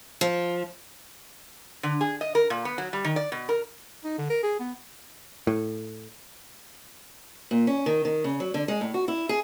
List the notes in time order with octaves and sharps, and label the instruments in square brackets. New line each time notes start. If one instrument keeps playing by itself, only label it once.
[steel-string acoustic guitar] F3
[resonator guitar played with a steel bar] D3
G#4
D#5
A#4
A#2
B3
F#3
G3
D#3
D5
B2
A#4
[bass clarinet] D#4
D3
A#4
G#4
B3
[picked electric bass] A2
[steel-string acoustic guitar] A#2
C#4
D#3
D#3
C#3
F#3
D3
G#3
A2
F#4
E4
G#4